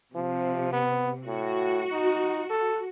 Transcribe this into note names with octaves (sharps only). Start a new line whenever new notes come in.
C3 F3
B3
A2 F#4
D#4
A4